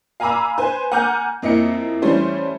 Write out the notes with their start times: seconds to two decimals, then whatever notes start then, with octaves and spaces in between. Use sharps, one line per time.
0.20 F5 G#5 A#5 B5 D6 E6
0.58 B4 C5 G#5
0.92 F#5 G#5 A#5 D6 F6 G6
1.42 F2 A#3 E4 D#5 C#7
2.02 E3 G3 A3 C#4 C5